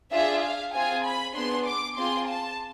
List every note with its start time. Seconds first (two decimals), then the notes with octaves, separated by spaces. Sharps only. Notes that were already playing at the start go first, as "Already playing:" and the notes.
0.12 D4 F4 G#4 E5
0.42 F5
0.74 C4 F4 G#4 G#5
1.05 B5
1.35 B3 D4 G#4 C6
1.66 D6
1.97 C4 F4 G#4 C6
2.28 A5